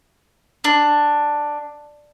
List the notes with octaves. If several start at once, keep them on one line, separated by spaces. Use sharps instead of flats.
D4